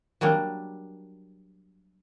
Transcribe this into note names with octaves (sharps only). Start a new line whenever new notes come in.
F#3 G3 A#3 D4